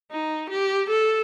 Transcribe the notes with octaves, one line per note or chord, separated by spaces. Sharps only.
D#4
G4
A4